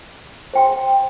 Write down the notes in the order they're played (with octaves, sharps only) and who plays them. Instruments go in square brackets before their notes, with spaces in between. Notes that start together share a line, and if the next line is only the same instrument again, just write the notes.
[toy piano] C5 G5 C6